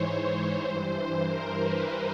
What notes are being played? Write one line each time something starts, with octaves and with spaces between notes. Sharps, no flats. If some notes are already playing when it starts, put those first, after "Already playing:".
Already playing: G#2 E3 C5 C#5
G2 E3
A#4
B4